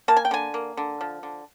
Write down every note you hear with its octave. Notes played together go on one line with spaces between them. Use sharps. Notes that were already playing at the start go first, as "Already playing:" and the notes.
A#3 A5
G#5
G5
D3 G#5
A#3
D3
F3
D3